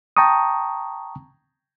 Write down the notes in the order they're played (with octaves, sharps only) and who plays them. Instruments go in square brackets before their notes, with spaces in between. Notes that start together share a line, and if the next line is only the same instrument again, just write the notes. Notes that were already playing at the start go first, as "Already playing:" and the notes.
[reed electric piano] G5 A5 A#5 C#6 D#6